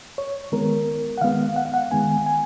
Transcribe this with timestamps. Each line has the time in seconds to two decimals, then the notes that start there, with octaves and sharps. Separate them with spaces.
0.18 C#5
0.52 D#3 G#3 B3 A#4
1.18 F#5
1.21 D#3 G#3 B3 F5
1.56 F#5
1.65 F5
1.74 F#5
1.91 D#3 G#3 B3 G#5
2.26 G#5